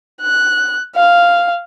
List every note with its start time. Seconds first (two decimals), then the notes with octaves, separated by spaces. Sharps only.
0.21 F#6
0.96 F5